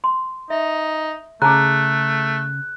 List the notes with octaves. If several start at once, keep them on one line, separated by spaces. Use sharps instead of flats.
C6
D#4 E5
C#3 A3 G#4 A5 A#5 F#6